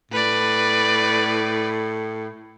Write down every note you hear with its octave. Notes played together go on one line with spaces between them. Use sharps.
A2 B4 D5